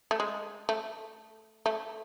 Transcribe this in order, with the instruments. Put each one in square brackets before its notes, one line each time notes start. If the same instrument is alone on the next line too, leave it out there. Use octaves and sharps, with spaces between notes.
[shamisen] A3
G#3
A3
A3